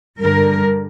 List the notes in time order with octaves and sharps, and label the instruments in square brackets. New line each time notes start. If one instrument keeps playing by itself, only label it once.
[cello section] G2 D3 G3 A#4